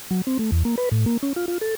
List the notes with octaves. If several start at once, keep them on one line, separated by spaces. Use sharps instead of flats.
F#3
C4
A3
E2
A#3
B4
A2
A#3
C#4
F4
F4
A4